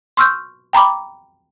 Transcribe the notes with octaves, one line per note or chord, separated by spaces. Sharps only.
C6 C#6 E6 F6 G6
G5 A#5 B5 D6